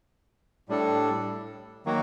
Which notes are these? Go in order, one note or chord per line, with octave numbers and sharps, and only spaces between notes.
A2 G3 D4 A4
D#3 F#3 A#3 F#4